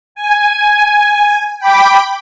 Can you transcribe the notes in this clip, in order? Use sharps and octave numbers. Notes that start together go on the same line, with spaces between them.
G#5
G5 B5 D6